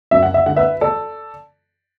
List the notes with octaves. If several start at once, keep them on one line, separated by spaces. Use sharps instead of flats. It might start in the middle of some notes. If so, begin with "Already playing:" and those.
F#2 E5
F#5
E5
D3 F#5
B4 E5
A4 D5